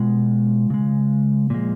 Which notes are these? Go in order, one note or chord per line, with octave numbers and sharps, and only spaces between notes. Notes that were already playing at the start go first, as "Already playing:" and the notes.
Already playing: B2 G#3 F4
C#3 G#3
A#2 F3 G#3